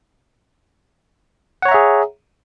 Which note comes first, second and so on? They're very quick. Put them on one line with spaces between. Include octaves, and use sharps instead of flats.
F#5 C#5 A#5 E5 G#4